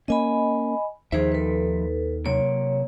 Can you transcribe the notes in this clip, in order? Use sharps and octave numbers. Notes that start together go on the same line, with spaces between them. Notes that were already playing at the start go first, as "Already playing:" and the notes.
A#3 C#4 D#5 G#5 B5
D#2 D#3 F3 D#4 G#4 C5 E5
A4 B4
C3 F#3 A#3 C#5